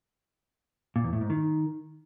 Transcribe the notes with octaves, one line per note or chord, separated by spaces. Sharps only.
A#2
E2
A2
G#2
D#3